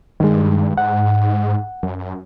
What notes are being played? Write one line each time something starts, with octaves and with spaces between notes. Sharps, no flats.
G2 D#3 G#3
G#2 F#5
F#2